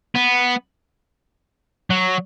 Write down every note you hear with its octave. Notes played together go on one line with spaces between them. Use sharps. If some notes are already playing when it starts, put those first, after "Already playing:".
B3
F#3